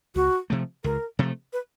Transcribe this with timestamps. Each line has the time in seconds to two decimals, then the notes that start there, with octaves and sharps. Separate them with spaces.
0.15 C#2 F#4
0.50 C3 F3 A3
0.84 C#2 A#4
1.19 C3 F3 A3
1.53 B4